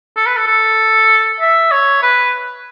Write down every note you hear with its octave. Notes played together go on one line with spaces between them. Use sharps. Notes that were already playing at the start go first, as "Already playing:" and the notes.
A4
B4
A4
A4
E5
C#5
B4